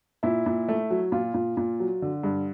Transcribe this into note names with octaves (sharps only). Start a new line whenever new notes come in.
A#2 E4
A#2
A3
F#3
A#2 F4
A#2
A#2
F#3
D3
G2